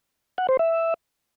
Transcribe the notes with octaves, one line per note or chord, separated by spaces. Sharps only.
F#5
C5
E5